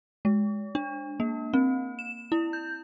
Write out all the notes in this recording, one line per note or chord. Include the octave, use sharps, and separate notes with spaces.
G#3
D4
A#3
C4
E7
E4
G6